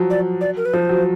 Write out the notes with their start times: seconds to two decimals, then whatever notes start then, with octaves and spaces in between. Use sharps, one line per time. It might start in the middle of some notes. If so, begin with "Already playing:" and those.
Already playing: F3 F#3
0.10 D5
0.41 D5
0.57 A#4
0.65 B4
0.73 F3 C5
0.89 F#3